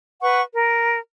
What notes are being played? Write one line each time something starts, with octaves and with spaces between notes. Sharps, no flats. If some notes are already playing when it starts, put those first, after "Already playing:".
B4 F#5 C#6
A#4